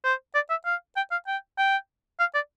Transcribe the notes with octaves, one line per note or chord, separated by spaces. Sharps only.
C5
D5
E5
F5
G5
F5
G5
G5
F5
D5